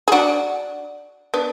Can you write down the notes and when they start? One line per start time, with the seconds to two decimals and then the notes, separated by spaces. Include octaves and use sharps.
0.08 G#4
0.12 D4 F#4
1.34 B3 D4